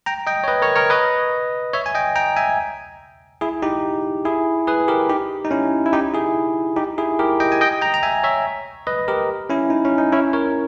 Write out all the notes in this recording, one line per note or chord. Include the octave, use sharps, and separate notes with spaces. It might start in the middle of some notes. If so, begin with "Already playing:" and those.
G5 A#5
D#5 G5
C#5
B4 D#5
A#4 C#5
A#4 C#5
B4 D#5
C#5 E5
G#5
D#5 G5
G5 A#5
E5 G#5
E4 G#4
D#4 G4
E4 G#4
G#4 B4
G4 A#4
D#4 G4
D#4
C#4 E4
E4
D#4 G4
E4 G#4
D#4 G4
E4 G#4
G4 A#4
D#5 G5
G#5
D#5 G5
G5 A#5
A#5
E5 G#5
C#5 E5
B4 D#5
G4 A#4
C#4 E4
D#4
C#4
D#4
C#4 E4
A#4 C#5